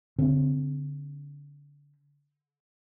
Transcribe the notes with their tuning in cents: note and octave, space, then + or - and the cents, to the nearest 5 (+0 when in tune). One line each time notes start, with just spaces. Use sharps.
D3 -30 C4 -10